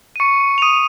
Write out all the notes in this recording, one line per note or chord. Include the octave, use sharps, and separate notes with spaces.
D#7
C#6 C#7
F7
D#6 D#7